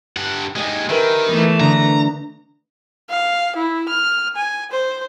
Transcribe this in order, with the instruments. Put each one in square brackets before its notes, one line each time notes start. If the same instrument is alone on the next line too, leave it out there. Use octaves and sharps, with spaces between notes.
[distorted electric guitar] G2 F#5
[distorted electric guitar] D#2 G#3 [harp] G4 D#5 G#5
[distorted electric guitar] D#3 [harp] A#4 B4 E5
[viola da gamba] E3 A3 [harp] B3
[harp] D3 D#5 [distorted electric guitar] A#5
[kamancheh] F5
E4
F6
G#5
C5